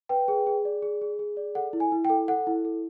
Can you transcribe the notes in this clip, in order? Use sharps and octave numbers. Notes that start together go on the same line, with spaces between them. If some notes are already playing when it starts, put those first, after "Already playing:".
B4 G5
G#4
G#4
D5
G#4
G#4
G#4
D5
A4 F#5
E4
G#5
E4
G5
A4
A4 F#5
E4
A4